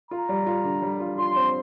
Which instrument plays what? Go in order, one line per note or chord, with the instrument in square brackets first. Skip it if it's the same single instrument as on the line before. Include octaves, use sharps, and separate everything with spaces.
[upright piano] F4 [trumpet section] A#5
[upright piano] G3
F4
D3
G3
F4
[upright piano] F4 [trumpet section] C6
[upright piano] C4